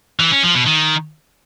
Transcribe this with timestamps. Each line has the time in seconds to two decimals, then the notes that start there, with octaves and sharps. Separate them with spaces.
0.20 E3
0.31 C#4
0.43 F3
0.55 B2
0.66 D#3